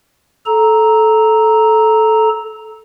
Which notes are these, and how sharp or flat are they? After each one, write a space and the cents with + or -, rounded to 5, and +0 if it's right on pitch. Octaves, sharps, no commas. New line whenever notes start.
A4 -15 A#5 +0